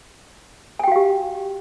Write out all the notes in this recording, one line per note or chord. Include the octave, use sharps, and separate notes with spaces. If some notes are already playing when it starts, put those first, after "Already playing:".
F#4 G4 F5 G5 G#5